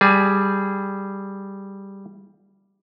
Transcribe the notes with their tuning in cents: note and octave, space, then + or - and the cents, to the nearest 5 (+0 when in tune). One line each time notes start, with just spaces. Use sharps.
G3 +0 G#4 +0 G#5 +40